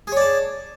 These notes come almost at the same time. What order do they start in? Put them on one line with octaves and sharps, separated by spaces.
G#4 C#5 D5 A5